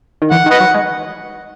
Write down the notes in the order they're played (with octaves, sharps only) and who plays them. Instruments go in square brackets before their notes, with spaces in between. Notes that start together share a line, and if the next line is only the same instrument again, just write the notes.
[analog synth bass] D#3
[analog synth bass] E3 [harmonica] F#5
[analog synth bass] D#3
[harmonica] B4 D#5 F#5
[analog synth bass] F#3
G#3